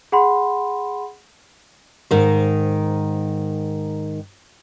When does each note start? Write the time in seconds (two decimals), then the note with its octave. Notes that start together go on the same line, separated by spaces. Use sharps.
0.12 G#4 F#5 B5 C6
2.11 G#2 D#3 C5